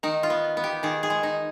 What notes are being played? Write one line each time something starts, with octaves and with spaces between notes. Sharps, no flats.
D#3 D#4
F4
B3
B3
G4
D#3 G#4
G#4
G#3
D#4